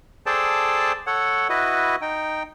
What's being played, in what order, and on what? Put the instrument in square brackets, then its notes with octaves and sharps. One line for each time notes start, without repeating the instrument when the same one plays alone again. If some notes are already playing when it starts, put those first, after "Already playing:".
[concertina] G#4 A4 C5 D5 G5 A5
A4 C#5 F#5
E4 F#4 B4 D#5
D#4 G5